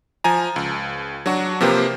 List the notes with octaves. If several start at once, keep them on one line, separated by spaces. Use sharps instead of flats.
F3 G#5 A#5
C#2
F#3 D4 F#4
C3 F3 A#3 G4 B4 C5